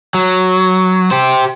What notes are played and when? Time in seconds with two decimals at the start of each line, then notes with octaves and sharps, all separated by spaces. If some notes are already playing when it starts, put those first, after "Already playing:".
0.14 F#3
1.11 G4 C5